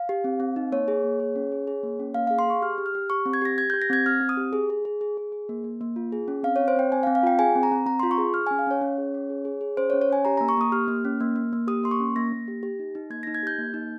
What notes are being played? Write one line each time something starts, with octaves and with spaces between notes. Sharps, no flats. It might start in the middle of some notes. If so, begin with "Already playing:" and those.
Already playing: F5
G4
C4
C4
D#4
A#3 C#5
G#4
A#3
G#4
C#4
G#4
G#4
A#3
C#4
A#3 F5
G#4 F5
C6
G#4 C#6
G4 F6
G4
F6
G4
G4 C#6
C4
G#6
G4 A#6
G4 G#6
G4 G6
A#6
C4 G#6
C4 F6
C4
D#6
G4
G#4
G#4
G#4
G#4
G#4
G#4
A#3
A#3
A#3
F4
G#4
C#4
C4 F5
C4 C#5
C5
C4 G5
C4 G#5
F5
C4
F5
F4 G5
G#4 G#5
C4
A#5
C4
C4 A#5
F4 C6
C#6
G#4
G#4 F6
C#4 G#5
F5
C#4 C#5
C#4
G#4
C#4
G#4
G#4
G#4
C#4 C5
C#5
C#4
C#5
C#4 G#5
G4 A#5
A#3 A#5
C#6
A#3 D#6
G4 F6
A#3
C#4
A#3
A#3
A#3
G4 D#6
A#3 C6
C#6
C#4
A#3 A#6
A#3
G4
G4
D#4
D#4
A#3 G#6
D#4 A#6
G#6
G4 G6
A#3
D#4